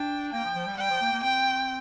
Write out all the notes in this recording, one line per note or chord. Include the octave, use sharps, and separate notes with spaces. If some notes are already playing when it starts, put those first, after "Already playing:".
Already playing: D4 G5
A#3 G5
F3
F3
G3
G3 G5
F3
A#3
A#3
C4 G5